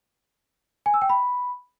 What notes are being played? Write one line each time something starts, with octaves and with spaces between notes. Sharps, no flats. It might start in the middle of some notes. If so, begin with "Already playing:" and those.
G#5
E6
G5
B5